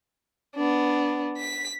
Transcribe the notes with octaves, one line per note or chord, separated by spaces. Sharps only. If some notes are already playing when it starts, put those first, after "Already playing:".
B3 D4
B6